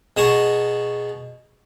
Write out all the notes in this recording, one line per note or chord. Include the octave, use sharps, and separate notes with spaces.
B2 G#4 A5 A#5 C#6